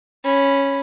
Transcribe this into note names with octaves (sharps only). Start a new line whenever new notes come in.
C#4 B5